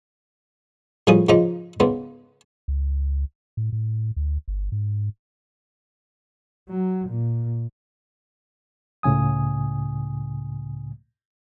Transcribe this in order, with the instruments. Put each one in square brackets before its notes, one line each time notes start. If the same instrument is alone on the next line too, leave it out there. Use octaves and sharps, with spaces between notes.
[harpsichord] A2 F3 G3 G#4 F5 D#6
G#2 C#3 F3 D#4 A#5 D6
G#2 C#3 B3
[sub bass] C#2
A2
A2
D2
G1
G#2
[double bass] F#3
A#2
[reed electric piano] C#2 A2 C#3 G#5 D#6